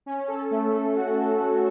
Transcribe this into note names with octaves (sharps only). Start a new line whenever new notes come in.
C#4
A4
A3
A4
F#4
A4
A3